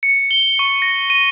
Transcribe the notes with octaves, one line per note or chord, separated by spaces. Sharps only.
C#7
G7
C#6
A#6
D#7